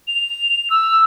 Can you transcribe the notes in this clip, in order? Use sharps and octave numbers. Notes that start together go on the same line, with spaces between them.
F7
E6